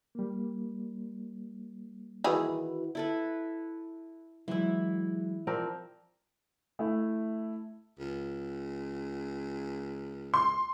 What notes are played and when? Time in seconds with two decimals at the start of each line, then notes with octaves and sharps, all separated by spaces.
0.15 G3 A#3
2.24 D#3 E3 E4 F#4 G#4 B4
2.95 E4 A4 B4
4.48 E3 F#3 G#3 E4
5.47 F3 C4 A#4 D5
6.79 A3 E4
7.99 C#2
10.34 C6